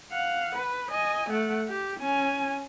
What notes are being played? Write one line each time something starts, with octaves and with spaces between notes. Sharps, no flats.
F5 F#5
B4
D#5 G#5
A3 F#5
G4
C#4 G#5